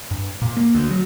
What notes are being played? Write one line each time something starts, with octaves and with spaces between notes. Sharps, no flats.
G2
A#2
A#3
D2
F#3